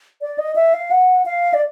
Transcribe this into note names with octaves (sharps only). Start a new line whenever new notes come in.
D5
D#5
E5
F5
F#5
F5
D5